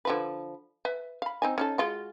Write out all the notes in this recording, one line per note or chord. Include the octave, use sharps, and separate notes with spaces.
D3 F3 B4
B4 E5
F5 B5
C4 D#4 G#5
C#4 D#4 A4
G#3 F4 F#4